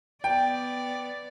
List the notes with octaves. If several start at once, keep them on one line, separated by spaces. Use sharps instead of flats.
B3 D5 G5